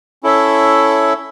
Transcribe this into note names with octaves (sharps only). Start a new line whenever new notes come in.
C#4 E4 A4 C#5 E5